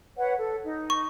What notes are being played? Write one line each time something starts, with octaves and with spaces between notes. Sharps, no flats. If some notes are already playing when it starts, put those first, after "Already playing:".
B4 C#5 F#5
A4
D#4
C#6